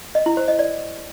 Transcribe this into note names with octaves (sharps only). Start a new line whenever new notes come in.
D#5
E4
C5
D#5
D5